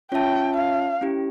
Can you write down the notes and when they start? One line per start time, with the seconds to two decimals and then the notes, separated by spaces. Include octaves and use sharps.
0.11 C#4 F4 C#5 E5 G5 A5
0.55 F5
1.01 C#4 E4 G4